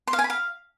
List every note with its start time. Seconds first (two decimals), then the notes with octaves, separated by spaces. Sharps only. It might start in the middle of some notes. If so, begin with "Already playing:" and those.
0.07 C6
0.13 F5
0.19 G#5
0.24 B5
0.30 F5